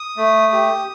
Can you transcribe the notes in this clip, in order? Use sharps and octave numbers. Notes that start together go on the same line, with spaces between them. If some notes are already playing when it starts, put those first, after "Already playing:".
Already playing: D#6
A3
G4